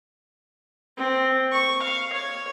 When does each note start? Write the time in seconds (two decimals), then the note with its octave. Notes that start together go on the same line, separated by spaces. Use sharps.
0.97 C4
1.52 C#6
1.82 F5
2.13 C#5